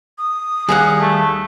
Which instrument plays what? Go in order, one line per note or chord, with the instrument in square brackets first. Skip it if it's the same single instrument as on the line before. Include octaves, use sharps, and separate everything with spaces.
[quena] D#6
[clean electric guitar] D#2 G3 A#3 [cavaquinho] G#4 F5 F#5
[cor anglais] A3